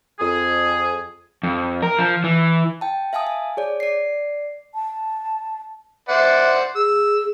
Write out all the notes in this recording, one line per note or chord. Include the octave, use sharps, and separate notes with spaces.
F2 G#4
F2
A#4
F3
E3
G5 A5
E5 F5 G#5 A5 D#6
G#5
G#4 C#5 D5
D5 C7
A5
C5 D5 E5 F#5
G#4 E6